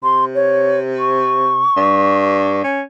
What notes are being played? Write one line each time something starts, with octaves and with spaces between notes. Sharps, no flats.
C3 C6
C#5
C#6
G2
C#4